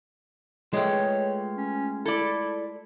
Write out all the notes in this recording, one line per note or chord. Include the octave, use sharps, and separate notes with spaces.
G#3 A3 F4 B4 C#5 G5
C#4
E4 A4 D5